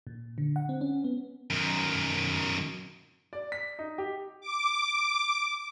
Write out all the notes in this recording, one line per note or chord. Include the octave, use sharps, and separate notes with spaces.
A#2
D3
F#5
C4
C#4
B3
F#2 D#3
D5
B6
D#4
G4
D6